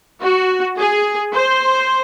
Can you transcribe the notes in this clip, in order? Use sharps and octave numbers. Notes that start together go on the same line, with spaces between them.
F#4
G#4
C5